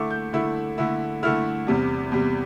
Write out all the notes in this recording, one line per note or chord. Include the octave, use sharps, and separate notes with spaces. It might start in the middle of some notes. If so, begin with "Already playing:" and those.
Already playing: D3 A3 E4 D6
G6
D3 A3 E4
D3 A3 E4
D3 A3 E4 F6
E2 C3 G3
E2 C3 G3